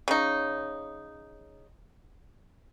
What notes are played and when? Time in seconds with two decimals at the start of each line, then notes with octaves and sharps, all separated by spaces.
0.08 C#3 D#4